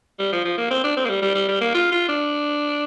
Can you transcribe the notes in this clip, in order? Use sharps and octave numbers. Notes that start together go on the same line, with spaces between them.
G3
F3
F3
A#3
C4
D4
C4
A#3
G3
G3
G3
G3
A#3
F4
F4
D4